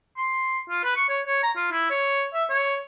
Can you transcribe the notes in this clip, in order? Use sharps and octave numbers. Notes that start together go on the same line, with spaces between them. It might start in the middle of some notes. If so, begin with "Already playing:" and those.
C6
F4
B4
C#6
C#5
C#5
A#5
F4
E4
C#5
E5
C#5